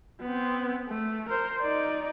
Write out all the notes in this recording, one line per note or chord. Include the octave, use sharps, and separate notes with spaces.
B3 C4
A3
A#4 C5
D#4 D5